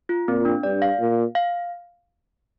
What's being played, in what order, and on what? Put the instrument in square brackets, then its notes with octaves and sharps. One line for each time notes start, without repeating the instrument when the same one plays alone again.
[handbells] F4
[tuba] A#2 [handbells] C4
[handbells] D4
[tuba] G2 [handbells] D5
[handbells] F5
[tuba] A#2
[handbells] F5